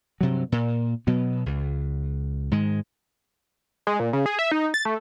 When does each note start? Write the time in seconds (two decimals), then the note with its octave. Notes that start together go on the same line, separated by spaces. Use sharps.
0.21 G2 C3 F#3
0.52 A#2
1.07 B2 F#3 B3
1.46 C#2
2.51 G#2 D#3 G#3
3.87 G#3
4.00 A#2
4.13 C#3
4.26 G#4
4.39 E5
4.52 D#4
4.74 A6
4.85 A3